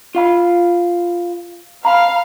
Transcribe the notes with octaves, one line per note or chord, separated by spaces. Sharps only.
F4 F5 B5
F5 A#5 B5